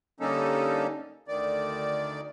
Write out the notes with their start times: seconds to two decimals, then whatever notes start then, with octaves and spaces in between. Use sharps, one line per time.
0.20 D3 G3 A#3 C#4 D#4 A4
1.28 D2 D#3 D5